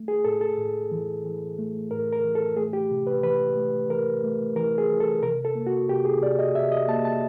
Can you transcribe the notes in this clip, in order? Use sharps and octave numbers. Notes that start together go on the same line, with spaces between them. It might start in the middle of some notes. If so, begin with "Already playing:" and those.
Already playing: A3
G#4
A2 A4
A4
A2
E3
E3
A3
A2 A#4
A#4
E3
A4
A3 G#4
G4
C3
B4
E3 B4
A3
E3 A#4
A3
E3 A#4
G#4
E3
A4
C3 A#4
A4
A#3
F#4
C3 G4
G#4
C3 D5
D#5
C3 E5
D#5
A#3 A5
A5